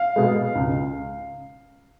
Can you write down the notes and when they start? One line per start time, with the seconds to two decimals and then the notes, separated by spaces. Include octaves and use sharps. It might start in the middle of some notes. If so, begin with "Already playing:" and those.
Already playing: F5
0.16 B2 G#3
0.55 C#2